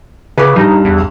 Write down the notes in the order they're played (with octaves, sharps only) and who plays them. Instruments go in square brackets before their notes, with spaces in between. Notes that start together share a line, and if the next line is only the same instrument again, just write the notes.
[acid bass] C#3 [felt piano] B4 D6
[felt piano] G2 [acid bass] D#4
[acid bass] E2